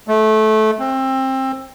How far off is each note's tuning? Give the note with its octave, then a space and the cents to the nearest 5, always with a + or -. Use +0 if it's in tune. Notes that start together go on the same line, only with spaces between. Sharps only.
A3 -20
C4 +20